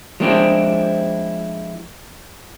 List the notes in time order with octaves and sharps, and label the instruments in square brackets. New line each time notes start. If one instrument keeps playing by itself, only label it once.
[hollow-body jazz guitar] F3 G#3 A#3 C4 D4 E4